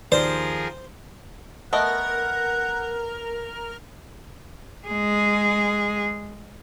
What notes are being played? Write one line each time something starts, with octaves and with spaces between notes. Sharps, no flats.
D#2 F3 G#4 A#4 C5 D5
A3 B3 A#4 D#5 F#5
G#3 G#4